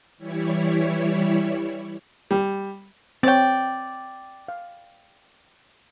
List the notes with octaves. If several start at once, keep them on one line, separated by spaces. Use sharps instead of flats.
E3 G3 E4 C#5
G3
C4 C#5 D5 G5
F5